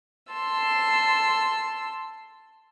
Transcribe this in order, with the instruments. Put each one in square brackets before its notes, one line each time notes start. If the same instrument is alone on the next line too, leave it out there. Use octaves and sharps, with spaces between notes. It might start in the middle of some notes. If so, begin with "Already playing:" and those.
[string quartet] A5 C6 E6